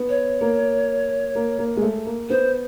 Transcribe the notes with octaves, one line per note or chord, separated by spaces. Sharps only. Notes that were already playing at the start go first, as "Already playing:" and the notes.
Already playing: B3
C#5
A#3
A#3
A#3
G#3
A3
A#3
B3 C5